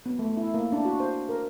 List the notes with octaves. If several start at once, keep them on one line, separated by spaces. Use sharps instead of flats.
B3
A3
E4
A#3
D4
F#4
C5
A#4